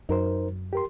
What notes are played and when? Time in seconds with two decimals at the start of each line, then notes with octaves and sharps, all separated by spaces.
0.09 F#2 D#4 A#4 C5
0.73 G4 A#4 C6